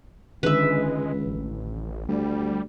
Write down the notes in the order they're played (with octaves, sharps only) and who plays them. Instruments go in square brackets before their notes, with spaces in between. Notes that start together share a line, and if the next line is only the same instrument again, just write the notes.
[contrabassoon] C#2 [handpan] D3 D#3 [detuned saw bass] G#3 [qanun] B4 E5
[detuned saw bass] A1
[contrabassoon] D2 [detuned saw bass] G3